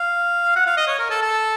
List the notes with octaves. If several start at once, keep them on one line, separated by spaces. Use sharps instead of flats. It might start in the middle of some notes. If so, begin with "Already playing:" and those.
Already playing: F5
F#5
F5
D#5
C#5
A#4
A4
A4